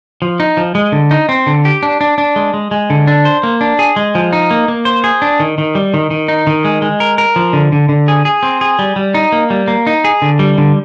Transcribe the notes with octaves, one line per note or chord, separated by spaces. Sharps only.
F3
D#4
F3
G#3
D3
D#4
C4
D3
G4
D4
D4
D4
G#3
G#3
G#3
D3
D4
C5
A#3
D4
G#4
G#3
F3
D#4
A#3
A#3
C5
G#4
D4
D#3
D#3
G3
D#3
D#3
D#4
D#3
G#3
G#3
A#4
A#4
F3
D3
D3
D3
G#4
G#4
C4
G#4
G3
G3
D#4
A#3
G3
A#3
D#4
G#4
D3
G3
D3